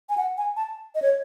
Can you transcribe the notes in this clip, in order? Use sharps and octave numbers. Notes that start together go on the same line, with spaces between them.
G#5
F#5
G#5
A5
D#5
C#5